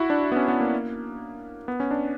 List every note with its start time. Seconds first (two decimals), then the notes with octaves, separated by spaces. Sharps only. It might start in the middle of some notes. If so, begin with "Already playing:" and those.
Already playing: E4 F#4
0.10 D4
0.32 B3
0.36 C#4
0.48 B3
0.60 A#3
1.68 B3
1.80 C#4
1.91 D4